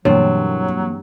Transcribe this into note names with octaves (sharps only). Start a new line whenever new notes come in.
G2 B2 E3 F#3 A#3 C4 C#5